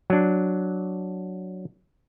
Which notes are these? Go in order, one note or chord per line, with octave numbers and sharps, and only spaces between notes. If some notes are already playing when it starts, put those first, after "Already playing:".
F#3 D4